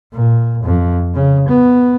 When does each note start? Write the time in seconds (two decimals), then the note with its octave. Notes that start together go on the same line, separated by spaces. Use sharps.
0.13 A#2
0.64 F2
1.14 C#3
1.48 B3